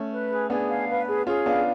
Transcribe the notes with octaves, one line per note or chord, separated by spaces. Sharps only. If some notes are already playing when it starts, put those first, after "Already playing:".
Already playing: A3 C#4
B4
G#4
B3 D4 G#4
F5
B4
G#4
C#4 F4 G#4
B3 D4 F5